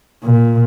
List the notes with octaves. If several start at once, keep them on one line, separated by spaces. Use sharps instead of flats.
A#2